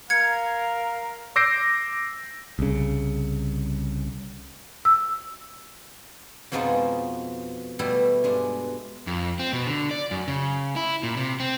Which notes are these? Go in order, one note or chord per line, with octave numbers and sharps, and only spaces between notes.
A#4 F5 G#6 C#7
D6 E6 G6 A#6 C7 D7
C2 C#3
E6
F2 B2 F3 G#3 B3 D#4
B2 G3 A3 E4
G2 G#3 D4
F2
C4
B2
D3
D5
F#2
C#3
E4
A#2
C3
C4